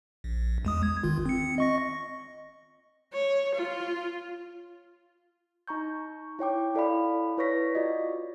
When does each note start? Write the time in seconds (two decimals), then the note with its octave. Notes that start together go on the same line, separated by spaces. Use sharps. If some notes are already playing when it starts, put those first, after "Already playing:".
0.24 A#1
0.65 E2 G#3 D#6
0.83 G#6
1.03 G1 D#3 F4
1.26 C4 C#7
1.58 D#5 C#6 A#6
3.13 C#5
3.55 F4
5.67 D#4 A#5 C#6 G6
6.39 E4 C#5 G5 D6
6.75 E4 A4 D5 F5 B5
7.38 E4 B4 C#5 C#6 A#6 B6
7.75 F4 F#4 D5 D#5